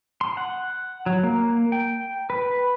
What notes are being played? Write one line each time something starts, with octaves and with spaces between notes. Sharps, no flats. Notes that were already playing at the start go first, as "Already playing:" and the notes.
C6
F#5
F#3
A#3
G5
B4